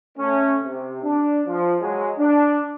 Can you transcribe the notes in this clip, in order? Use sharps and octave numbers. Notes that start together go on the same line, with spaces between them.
A3 C#4
C3
D4
F3
F#3 G#3
D4